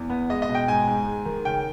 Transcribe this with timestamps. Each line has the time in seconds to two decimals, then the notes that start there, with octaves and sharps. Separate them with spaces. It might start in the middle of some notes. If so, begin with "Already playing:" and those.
Already playing: E2
0.10 B3
0.29 G#3 D#5
0.42 D#5
0.49 B2
0.55 G5
0.68 G#2 G#5
0.87 G#2
1.06 G#3
1.25 D#3
1.45 C#3 G5